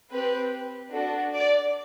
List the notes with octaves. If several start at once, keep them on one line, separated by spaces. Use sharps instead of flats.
C4 G4 B4
D4 F#4 A4
D5